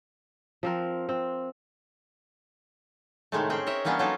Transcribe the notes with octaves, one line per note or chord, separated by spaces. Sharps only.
F3 C4 A#4
C4
A2 C3 D#3 G#3 A3
C4 C#4 G#4 G5
A#4 C#5 D#5 E5
E3 G3 A#3 B3 C#4 D4
F#3 A#3 B3 D#4 F4 A4